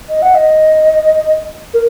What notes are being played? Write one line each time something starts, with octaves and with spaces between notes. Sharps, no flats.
D#5
F#5
D#5
A#4